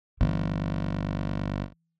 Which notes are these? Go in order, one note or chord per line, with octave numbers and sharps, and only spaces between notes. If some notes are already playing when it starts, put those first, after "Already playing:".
G1 E3